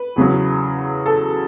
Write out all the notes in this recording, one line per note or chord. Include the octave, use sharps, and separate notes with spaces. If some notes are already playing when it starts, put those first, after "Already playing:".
Already playing: B4
E2 C#3 F#3
A4